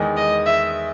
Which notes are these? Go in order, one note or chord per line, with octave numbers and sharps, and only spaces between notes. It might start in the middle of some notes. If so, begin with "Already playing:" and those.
Already playing: E2 D#3 G#3
D#5
E5